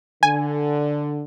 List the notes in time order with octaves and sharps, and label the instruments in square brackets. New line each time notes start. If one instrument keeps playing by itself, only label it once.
[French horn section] D3 [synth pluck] G#5